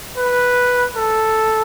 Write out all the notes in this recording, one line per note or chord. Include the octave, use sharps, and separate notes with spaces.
B4
A4